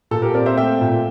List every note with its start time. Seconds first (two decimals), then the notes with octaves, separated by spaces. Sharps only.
0.11 A#2 A4
0.22 G4 A#4
0.34 C4 A#4 D5
0.46 C5 E5
0.57 A3 E5 G5
0.81 A#2